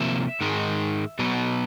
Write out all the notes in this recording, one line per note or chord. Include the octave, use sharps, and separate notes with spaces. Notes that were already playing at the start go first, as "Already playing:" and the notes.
Already playing: C3 F3 A#3 E5
G#2 D#3 G#3
B2 F#3 B3